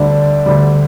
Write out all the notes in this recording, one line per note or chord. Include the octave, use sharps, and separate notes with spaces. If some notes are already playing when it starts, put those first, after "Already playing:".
Already playing: D2 D3 G3 D4
D2 D3 G3